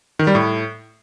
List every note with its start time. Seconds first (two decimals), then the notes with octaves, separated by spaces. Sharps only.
0.19 D#3
0.27 G3
0.35 A2